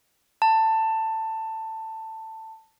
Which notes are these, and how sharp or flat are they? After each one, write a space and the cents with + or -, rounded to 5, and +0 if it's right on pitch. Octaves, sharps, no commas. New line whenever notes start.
A5 +15